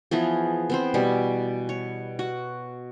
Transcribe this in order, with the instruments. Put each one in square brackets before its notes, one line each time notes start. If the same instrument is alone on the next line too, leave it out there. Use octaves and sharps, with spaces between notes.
[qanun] E3 F3 B3 G#4
B3 C4 C5
B2 G3 G#5
C#5
F#4